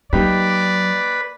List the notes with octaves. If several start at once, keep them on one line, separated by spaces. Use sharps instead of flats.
F#3 A#3 D#4 G4 B4 D5